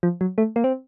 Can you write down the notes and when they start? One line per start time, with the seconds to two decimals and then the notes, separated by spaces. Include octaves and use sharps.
0.03 F3
0.21 F#3
0.38 A3
0.56 A#3
0.64 C4